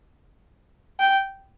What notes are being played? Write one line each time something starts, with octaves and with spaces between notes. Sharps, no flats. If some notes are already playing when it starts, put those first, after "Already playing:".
G5